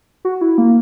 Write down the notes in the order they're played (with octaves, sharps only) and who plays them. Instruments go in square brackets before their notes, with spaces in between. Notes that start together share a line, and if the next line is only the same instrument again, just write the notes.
[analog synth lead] F#4
E4
A#3